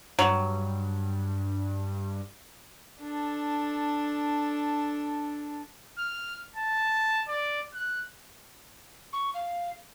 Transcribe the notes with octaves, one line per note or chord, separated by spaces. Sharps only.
G2 F#3
D4 A4
F6
A5
D5
F#6
C#6
F5